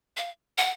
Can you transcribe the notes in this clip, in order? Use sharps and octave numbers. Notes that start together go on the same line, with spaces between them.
F5
F#5